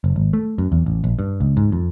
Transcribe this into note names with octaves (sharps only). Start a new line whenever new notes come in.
F#1
G#1
A3
F#2
E2
A1
A#1
G2
C#2
G#2
F2